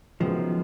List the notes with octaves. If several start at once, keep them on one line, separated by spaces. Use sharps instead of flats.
F#2 D#3 F3 G#3 B3